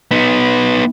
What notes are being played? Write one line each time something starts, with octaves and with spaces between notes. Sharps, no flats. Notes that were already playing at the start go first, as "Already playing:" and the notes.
B3 D#4